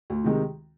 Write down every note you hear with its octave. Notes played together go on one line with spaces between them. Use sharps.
D2
C3 D#3 G#3